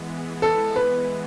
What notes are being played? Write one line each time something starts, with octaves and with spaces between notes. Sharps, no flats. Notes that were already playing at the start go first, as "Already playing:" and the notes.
Already playing: E3 G#3 B3
A4
B4